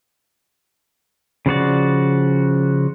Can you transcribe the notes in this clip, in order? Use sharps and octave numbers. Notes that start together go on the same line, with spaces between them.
C#3 F3 F#4 D5